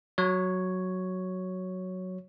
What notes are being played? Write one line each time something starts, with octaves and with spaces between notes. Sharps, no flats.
F#3 C#5